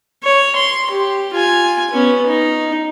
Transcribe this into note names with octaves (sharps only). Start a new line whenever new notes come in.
C#5
C6
G4
F4 G#5
B3 C#4
D#4